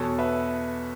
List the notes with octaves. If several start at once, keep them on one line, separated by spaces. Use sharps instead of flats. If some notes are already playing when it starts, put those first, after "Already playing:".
Already playing: E2 B2 A4 C#5
B4 E5